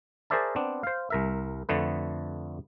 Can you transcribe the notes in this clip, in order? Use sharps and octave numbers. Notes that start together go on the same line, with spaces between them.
G#4 A#4 C5 D5 E5 A5
B3 C4 D4
C5 F5
C2 A#4 E5
F2 D3 A3 B4